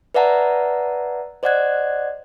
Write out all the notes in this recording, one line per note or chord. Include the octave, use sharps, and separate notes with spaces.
B4 D5 E5 F#5 A5 A#5
C5 D5 D#5 F#5 F#6 G#6